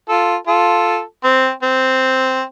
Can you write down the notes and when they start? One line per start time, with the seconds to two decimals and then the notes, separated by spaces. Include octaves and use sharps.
0.09 F4 A4
0.48 F4 A4
1.24 C4
1.62 C4